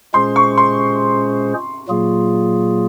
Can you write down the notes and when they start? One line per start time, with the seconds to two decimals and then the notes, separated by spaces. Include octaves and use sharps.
0.14 A#2 G#3 C#4 G#4 C5 C6
0.36 C#6
0.58 C6
1.88 A#2 F#3 A#3 F4 G#4